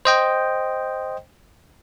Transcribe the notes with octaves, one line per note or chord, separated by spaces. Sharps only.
C5 D#5 G5